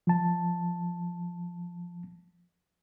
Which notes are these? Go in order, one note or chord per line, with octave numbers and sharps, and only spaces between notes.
F3 A5